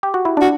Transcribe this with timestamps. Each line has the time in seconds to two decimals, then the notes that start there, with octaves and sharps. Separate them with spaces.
0.03 G4
0.14 F#4
0.25 E4
0.37 D4 F#4